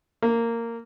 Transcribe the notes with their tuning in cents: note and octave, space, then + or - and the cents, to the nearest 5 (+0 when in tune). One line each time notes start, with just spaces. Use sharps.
A#3 -15